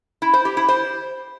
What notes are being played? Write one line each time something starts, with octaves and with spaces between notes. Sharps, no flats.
E4
C5
G4
E4
C5